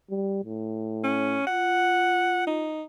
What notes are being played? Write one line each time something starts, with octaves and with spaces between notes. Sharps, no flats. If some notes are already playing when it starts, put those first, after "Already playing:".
G3
A2
C#4
F4 F#5
D#4